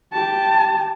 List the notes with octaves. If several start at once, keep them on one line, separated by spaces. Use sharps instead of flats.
G4 A5